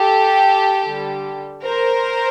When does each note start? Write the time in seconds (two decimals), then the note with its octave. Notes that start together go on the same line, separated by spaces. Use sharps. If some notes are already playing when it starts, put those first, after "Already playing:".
Already playing: G4 A4
0.85 D3 G3
1.64 A#4 C5